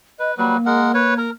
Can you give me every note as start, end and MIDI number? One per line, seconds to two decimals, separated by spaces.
0.19 0.35 71
0.19 0.32 75
0.38 0.57 54
0.38 0.57 55
0.38 1.29 58
0.38 0.57 71
0.66 0.92 56
0.66 0.92 70
0.66 0.92 78
0.94 1.14 71
0.94 1.14 73
1.18 1.30 70
1.18 1.30 82